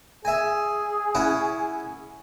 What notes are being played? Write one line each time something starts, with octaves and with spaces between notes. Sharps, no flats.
G#4 E5 G#5
C#4 E4 F#5